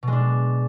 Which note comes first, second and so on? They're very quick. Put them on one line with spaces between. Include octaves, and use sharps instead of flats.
B2 G#3 D4